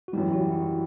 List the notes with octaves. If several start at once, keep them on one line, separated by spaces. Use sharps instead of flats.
F#4
F#2 E3 G3 G4
F#4
E4